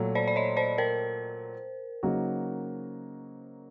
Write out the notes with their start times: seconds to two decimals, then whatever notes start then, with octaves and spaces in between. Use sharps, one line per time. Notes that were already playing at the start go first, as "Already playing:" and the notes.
Already playing: A#2 F#3 A3 C#5
0.15 C5 D5
0.28 D5
0.36 C#5 D#5
0.57 C5 D5
0.78 A#4 C5
2.03 C#3 F#3 A#3 D#4 F#4